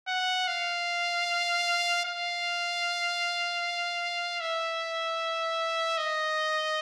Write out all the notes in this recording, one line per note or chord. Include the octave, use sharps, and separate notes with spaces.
F#5
F5
F5
E5
D#5